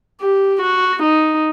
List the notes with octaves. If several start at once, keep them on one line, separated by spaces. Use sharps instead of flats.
G4
F#4
D#4